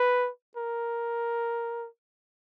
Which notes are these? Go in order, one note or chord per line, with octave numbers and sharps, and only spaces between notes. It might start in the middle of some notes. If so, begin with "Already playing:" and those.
Already playing: B4
A#4